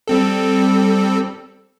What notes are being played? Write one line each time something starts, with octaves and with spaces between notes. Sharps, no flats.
G3 C4 A4